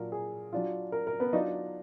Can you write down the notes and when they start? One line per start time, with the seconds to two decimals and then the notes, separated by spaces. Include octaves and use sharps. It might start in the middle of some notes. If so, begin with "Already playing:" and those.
Already playing: A#2 F#3 D4 F4 A#4
0.12 G#4
0.53 F#3 D4 F4
0.92 A#4
1.07 A#4
1.20 B3 B4
1.33 F#3 D4 D#4 F4 D#5